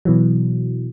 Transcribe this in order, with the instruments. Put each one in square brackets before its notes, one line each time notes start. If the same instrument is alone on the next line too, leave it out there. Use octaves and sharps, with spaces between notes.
[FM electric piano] B2 E3 F#3